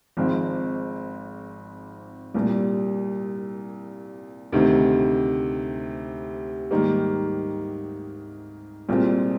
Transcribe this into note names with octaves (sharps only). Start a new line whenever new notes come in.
G#1 G#2 F3 G#3 C4
C2 A#2 G3
D2 C3 D#3
G#2 D#3 G3 A#3
C2 A#2 G#3 C4 F4